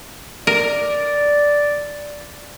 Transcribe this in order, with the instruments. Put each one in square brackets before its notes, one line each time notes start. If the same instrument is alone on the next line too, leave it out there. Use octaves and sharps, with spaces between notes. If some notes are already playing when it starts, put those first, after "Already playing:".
[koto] A#4 [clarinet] D5